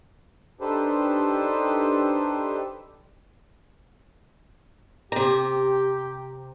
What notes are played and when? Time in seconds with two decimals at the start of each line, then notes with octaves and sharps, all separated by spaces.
0.61 D4 D#4 G4 A4 B4 C5
5.12 C3 G4 A#5